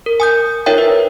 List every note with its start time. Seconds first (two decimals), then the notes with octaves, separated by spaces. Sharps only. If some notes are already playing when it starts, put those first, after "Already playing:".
0.06 A#4
0.20 G#5 D#6 G6
0.66 D#4 F4 A#4 C#5 E5 G5
0.78 B4